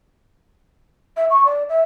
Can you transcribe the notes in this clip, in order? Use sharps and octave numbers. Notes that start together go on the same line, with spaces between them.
E5
C#6
D5
E5